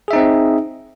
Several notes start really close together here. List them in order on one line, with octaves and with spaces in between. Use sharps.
G#4 E5 D#4 C4 D#5